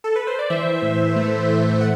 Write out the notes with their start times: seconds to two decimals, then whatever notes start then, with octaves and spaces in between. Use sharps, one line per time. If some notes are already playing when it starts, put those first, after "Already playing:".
0.04 A4
0.16 B4
0.27 C5
0.39 D5
0.50 E3 C5 E5
0.82 A2
1.16 A3
1.48 A2
1.81 F#5